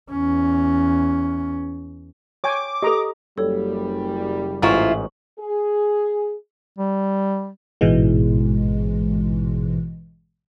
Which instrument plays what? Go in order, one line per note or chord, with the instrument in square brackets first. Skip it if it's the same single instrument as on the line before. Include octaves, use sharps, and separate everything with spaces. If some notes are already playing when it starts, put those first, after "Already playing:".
[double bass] E2 C#4
[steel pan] C#5 G5 G#5 [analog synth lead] D6
[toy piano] G4 A4 [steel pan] D#5 A#5
[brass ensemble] F#1 F#2 G3 [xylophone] A4 C#5
[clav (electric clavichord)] A1 G#2 [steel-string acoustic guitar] E4 F4 C5 [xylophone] A#5 C#6 E7
[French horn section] G#4
[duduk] G3
[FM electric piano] A1 G#2 B2 E3 G#3